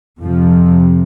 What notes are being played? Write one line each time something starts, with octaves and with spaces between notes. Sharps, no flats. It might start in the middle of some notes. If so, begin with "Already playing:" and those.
F2 C3 F3